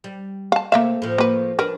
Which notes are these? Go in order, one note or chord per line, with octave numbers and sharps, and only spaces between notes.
G3
F5 A5
C3 A3 A#3 E5 F5
A2 F3
A#3 B4
D4 A#4 B4